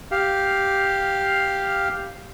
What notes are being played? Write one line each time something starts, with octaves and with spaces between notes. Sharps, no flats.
G4 F5